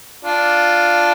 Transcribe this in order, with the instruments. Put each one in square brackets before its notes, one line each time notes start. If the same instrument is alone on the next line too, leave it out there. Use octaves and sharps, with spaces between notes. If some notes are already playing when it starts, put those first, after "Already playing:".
[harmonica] D4 F4